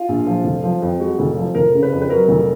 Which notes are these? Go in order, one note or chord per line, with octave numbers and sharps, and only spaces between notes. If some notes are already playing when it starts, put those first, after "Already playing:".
Already playing: F4
A#1
F3
F1
F3
F2
G#3 F#4
F1
F3
F1 A#4
C#3
B4
F2
B4
F#3 A#4
F1